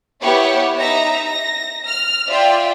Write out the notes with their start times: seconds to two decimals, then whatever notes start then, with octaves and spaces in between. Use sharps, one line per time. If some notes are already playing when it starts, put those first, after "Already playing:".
0.21 B3 E4 G4 C#5
0.77 D#4 E5 A#5 A#6
1.23 A#6
1.86 F6
2.28 F4 D5 E5 G5